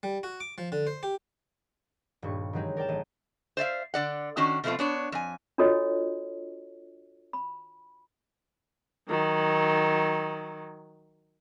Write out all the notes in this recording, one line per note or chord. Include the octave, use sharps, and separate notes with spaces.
G3
F#4
D6
F3
D3
C5
G4
D#1 G2 C#6
D#3 E3 F#3 G#3 C4 D#4
A#4 D5 G5 A5
A1 D#3 A3 D#5 D#7
C5 D5 E5 F5
D3 D5 F#5
D#3 C#4 D4 F#4
B2 F3 A3 C4 F4
B3 D4 C#5
F2 G#5
D4 F4 F#4 A4 C#5 D#5
B5
D#3 F#3